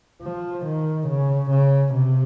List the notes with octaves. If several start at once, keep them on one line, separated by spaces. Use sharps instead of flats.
F3
D#3
C#3
C#3
C3